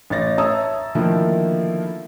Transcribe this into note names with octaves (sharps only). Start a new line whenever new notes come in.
A1 C#5 A6 A#6
C#5 E5 A5 A#5 D#6 E6
D3 D#3 F3 A3 A#3 E4